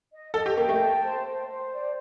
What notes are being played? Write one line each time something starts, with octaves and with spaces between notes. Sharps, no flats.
D#5
A4 D#5
G4
A#3 G5
A3
A5
C5
C5
C5
D5